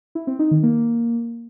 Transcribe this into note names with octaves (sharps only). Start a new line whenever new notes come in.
E4
C4
D#4
D#3
A#3